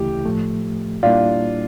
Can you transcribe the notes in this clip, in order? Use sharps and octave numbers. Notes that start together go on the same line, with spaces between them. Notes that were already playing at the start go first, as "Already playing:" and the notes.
Already playing: D2 C#3 E3 A3 E4 G4
A2 F3 A3
A#2 G3 A#3 D4 E4 F4